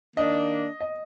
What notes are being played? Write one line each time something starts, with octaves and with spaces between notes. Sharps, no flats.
D#3 A#3 D4 D#5
D#5